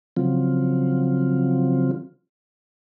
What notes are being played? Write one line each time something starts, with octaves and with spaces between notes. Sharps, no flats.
C#3 F3 F#3 C4 F4